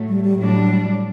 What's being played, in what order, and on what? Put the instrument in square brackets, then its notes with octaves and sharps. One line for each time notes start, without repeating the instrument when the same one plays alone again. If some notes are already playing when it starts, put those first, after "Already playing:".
Already playing: [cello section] A2 F#3 A3
[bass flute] G3
G3
[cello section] A2 G3 D4 [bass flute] F#3